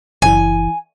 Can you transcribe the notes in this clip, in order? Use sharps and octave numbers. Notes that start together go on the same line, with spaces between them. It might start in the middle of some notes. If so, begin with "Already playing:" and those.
F#1 E3 E4 G#5